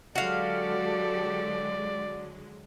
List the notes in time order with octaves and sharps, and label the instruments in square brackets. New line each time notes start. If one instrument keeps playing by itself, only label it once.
[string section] D3 F#3 G#3 [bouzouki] F#4 F5 [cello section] G4 A4 [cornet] D5